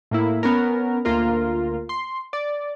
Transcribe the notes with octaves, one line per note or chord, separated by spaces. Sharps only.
A2 A#3 E4
B3 C#4 A#4
D2 A#3 F4 A#4
C6
D5